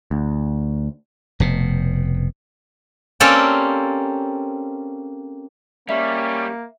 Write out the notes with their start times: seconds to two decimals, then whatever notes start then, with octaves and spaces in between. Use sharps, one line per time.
0.11 D2
1.40 F1 B2
3.20 A#3 C4 C#4 G4 A4 D5
5.89 G3 A#3 C#4 E5